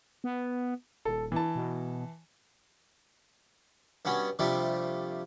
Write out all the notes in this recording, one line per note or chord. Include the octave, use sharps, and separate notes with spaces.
B3
D#1 A4
E3 A5
B2
G2 B3 C#4 F#4
C3 F3 G3 A3 D4